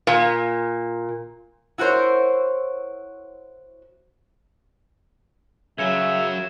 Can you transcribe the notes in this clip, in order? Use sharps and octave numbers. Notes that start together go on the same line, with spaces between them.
A#2
E4 F#4 A#4 C5 C#5
F#2 C#3 F#3 E5 G#6 C#7 E7